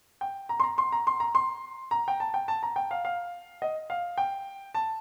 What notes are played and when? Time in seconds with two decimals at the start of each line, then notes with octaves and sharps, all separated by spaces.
0.21 G5
0.49 A#5
0.60 C6
0.64 A#5
0.78 C6
0.92 A#5
1.07 C6
1.20 A#5
1.35 C6
1.91 A#5
2.08 G5
2.20 A5
2.34 G5
2.48 A5
2.63 A#5
2.76 G5
2.91 F5
3.05 F5
3.62 D#5
3.90 F5
4.18 G5
4.75 A5